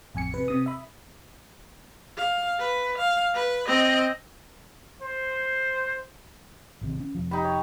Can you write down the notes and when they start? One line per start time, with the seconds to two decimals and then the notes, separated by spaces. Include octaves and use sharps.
0.14 A1 F2 G#5 C#7
0.34 C3 B4
0.48 C3 D#6
0.66 E5 B5
2.18 F5
2.60 B4
2.98 F5
3.34 B4
3.67 C4 D#5
5.02 C5
6.81 G#1 C3 D#3
7.00 C#4
7.15 F1 F3
7.31 D#4 G4 B5
7.45 C#5